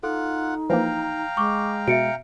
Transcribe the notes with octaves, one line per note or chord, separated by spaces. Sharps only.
D#4 F4 A4 F#5
E3 F3 A#3 F5 G5 A#5
G#3 C#6 D6
B2 E5 C#7 D7